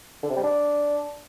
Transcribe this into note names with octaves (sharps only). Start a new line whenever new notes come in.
D3
C3
G3
D4